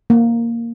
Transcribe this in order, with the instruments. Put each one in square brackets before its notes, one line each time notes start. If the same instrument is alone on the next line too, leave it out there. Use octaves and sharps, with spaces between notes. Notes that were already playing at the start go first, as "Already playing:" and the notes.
[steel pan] A#3